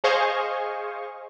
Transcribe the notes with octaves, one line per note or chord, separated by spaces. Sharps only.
G#4 C5 D#5 F5 G#5 C#6